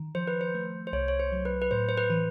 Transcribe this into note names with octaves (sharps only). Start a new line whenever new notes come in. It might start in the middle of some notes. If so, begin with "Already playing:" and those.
Already playing: D#3
F3 C5
B4
C5
A3
C5
C2 C#5
C#5
C5
F#3
B4
B4
A2 C5
C5
B4
E3